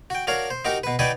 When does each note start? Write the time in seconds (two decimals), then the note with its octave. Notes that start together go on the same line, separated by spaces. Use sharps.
0.10 F#4 G5
0.27 D4 F#4 A#4 C#5 F5
0.50 C5
0.65 D#4 F#4 G4 A#4
0.84 B2 B4
0.99 D#4 F#4 B4 D5 G5 G#5